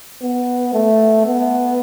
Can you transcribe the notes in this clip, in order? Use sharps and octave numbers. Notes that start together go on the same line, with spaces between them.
B3
A3
B3